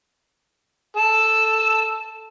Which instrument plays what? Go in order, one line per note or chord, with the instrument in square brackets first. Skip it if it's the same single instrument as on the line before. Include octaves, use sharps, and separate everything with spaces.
[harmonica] A4 [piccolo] E7